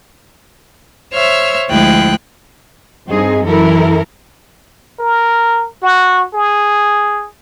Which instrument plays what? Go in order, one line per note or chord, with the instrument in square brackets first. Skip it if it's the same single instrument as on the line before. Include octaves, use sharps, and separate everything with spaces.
[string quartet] C5 C#5 E5 E6 F6
D2 F3 G#3 E4 G5 F#6
[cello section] G2 C4 D#4 G#4
F#2 E3 E4 A4 A#4
[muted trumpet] A#4
F#4
G#4